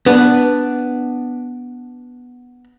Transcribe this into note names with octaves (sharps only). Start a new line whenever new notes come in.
B3 D4